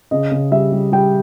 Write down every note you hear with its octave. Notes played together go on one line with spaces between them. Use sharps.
C#3 D#5
C#3
G3 E5
G3
G3 G5